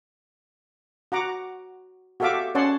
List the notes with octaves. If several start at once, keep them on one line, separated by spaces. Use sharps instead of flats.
F#4 F#5 A#5 D6
F#4 G4 A4 E5 F5 D6
C#4 C#5 D5 F#5 A5 C6